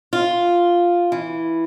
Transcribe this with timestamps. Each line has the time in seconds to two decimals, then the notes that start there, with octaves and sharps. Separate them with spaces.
0.13 F4
1.12 E3